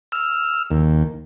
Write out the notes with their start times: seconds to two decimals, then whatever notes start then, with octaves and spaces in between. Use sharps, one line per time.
0.12 E6 F6
0.71 D#2